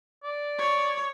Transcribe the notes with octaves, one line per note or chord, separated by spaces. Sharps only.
D5
C#5